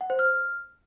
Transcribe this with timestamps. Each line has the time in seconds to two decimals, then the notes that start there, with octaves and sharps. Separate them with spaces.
0.01 F#5
0.10 C5
0.19 F6